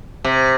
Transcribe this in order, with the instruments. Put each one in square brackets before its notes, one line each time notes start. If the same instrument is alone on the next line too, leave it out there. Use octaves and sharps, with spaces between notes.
[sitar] C3